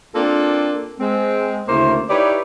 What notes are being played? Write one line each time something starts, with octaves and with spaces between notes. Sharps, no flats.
A#3 C4 D4 F4 A4
G#3 C4
D2 C#3 A3 A#3 E4 C5
D#4 E4 G4 B4 C#5 D5